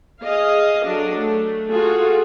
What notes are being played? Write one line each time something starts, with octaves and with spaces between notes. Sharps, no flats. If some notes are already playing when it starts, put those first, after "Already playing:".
G#4 D#5 F5
F#3 D4 A4
A3
F4 F#4 G#4 A4